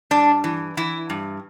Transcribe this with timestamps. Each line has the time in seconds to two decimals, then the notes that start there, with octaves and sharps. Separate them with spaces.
0.11 G2 D4
0.44 E3
0.77 E3 E4
1.10 G2